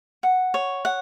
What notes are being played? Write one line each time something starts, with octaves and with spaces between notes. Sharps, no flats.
F#5
C#5
F#5